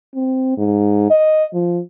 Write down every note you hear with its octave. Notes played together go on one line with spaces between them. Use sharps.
C4
G#2
D#5
F3